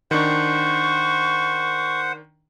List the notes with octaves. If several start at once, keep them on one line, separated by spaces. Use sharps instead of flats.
D#3 D4 C5 F#5 C#6